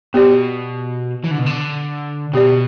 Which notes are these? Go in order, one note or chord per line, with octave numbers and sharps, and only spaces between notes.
B2 B3 G4 D5
E3
D3
B2
D3
B2 B3 G4 D5